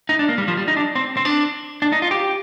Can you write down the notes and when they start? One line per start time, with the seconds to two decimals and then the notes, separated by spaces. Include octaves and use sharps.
0.09 D#4
0.19 D4
0.29 A#3
0.38 G3
0.48 F3
0.57 G3
0.68 D#4
0.77 D4
0.95 C4
1.17 C4
1.25 D4
1.82 D4
1.92 D#4
2.02 F4
2.11 G4